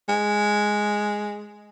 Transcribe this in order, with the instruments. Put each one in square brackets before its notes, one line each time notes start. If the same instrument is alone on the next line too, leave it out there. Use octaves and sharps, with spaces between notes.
[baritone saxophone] G#3